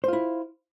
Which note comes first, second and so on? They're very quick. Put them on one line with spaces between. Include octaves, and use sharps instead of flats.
C5 F4 E4